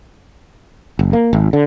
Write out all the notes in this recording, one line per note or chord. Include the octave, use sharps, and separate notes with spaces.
F#1
A#3
G#1
D3